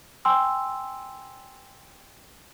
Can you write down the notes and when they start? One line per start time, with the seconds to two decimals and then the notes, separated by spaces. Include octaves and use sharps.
0.25 G5 G#5 C6 E6